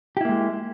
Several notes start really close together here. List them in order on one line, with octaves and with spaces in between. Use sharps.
G4 E4 A#3 G#3